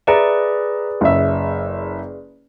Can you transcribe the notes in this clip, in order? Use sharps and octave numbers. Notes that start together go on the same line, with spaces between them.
G#4 B4 D5 E5 A#5
F#1 E5